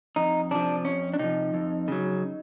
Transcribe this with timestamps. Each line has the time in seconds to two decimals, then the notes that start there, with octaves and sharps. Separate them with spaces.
0.16 F2 D#4
0.51 C3 F3 D4
0.85 F2 C#4
1.14 D4
1.19 C3 F3 D#4
1.54 F2
1.88 C#3 F#3